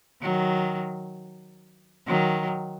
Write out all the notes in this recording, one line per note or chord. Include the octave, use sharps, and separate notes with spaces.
D#3 F#3
D#3 F#3